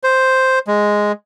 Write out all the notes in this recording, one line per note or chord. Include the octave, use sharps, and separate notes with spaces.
C5
G#3